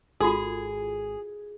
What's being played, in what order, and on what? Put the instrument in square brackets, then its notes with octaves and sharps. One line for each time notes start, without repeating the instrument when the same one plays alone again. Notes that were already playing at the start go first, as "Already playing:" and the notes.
[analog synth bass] G#1 [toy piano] F4 F#4 A4 [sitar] G#4